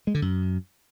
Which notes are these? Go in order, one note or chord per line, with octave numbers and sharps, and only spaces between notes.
G#3
D3
F#2